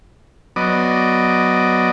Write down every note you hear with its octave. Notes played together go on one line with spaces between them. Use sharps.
F#3 B3 D5 D#5